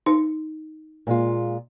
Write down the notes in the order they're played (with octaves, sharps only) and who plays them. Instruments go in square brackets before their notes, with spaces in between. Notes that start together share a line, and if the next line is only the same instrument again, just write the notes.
[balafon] D#4
[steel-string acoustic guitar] A#2 G#3 F4